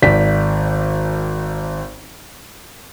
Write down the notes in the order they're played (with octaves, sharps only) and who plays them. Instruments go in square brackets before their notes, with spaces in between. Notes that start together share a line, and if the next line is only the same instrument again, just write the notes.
[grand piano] G#1 D5 B6